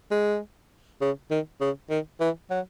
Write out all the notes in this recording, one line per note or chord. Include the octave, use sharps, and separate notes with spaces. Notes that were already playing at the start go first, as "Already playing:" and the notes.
G#3
C#3
D#3
C#3
D#3
E3
F#3